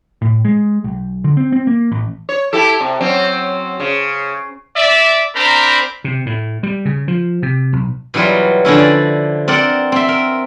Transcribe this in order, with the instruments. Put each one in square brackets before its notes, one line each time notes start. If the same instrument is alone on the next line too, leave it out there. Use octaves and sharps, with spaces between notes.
[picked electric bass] A2
G#3
B1
D3
C4
C4
A#3
A1
[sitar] C#5
E4 G4 A4
C3
F#3 C4 C#4
C#3
[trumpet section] D5 E5
C4 D4 A#4 C5 A#5 B5
[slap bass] C3
A2
G3
C#3
F3
C3
B1
[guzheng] B2 E3 F#3 G3 F4
D3 F3 C#4 E4
D5
C4 A#4 D5 F#5
C4 E5
A#4